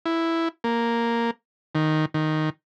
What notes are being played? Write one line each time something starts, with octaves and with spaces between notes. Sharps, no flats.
E4
A#3
D#3
D#3